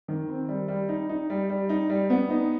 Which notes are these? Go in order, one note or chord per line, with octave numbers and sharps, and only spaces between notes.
D#3
C4
G3
G3
D#4
D#4
G3
G3
D#4
G3
B3
D#4